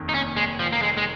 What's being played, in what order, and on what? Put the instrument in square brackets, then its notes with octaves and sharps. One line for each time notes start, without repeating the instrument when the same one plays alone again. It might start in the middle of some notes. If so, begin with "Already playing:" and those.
Already playing: [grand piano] F1 D#2 D#3
[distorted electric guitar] D#4
C#4
G#3
F3
A#3
G#3
G#3